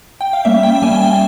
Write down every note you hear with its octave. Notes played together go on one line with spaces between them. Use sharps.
G5
F5
G3 A#3 C#4 E5
G5
G3 A#3 C#4 G#5